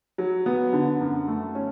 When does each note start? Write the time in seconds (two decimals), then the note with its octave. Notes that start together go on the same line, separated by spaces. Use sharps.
0.18 F#3
0.46 B3
0.73 D3
1.00 F#2
1.28 A3
1.55 C#4